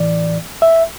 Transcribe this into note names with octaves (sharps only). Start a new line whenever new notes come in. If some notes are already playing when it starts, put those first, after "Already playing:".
Already playing: A2 E3 D5
E5